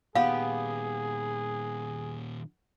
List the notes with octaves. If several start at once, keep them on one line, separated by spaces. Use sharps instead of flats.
A#2 D#3 B3 G4 G#4 F5